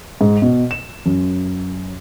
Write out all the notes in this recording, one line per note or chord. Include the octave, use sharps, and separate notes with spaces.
G#2
B2
E7
F#2